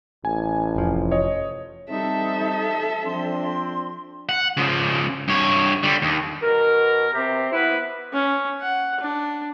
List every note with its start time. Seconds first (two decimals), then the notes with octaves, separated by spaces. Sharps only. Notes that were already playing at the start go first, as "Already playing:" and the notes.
0.25 A1 G#5
0.76 F1 F3
1.11 C#5 D#5
1.90 G3 C4 D#4 A4 E5
3.06 F3 C4 D4 C6
4.29 F#5
4.57 C#3 F3
5.28 G2 C#5
5.83 D3 G3
6.02 D#2
6.43 B2 A#4
7.13 C3 C4 G4
7.52 B3 E4 B4
8.13 C#4
8.61 F#5
9.00 D4